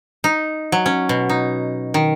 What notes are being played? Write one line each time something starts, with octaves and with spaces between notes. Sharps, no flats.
D#4
F#3
C#4
B2
D#4
D#3